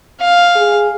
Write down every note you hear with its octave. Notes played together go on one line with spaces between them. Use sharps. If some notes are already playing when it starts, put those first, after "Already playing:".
F5
G#4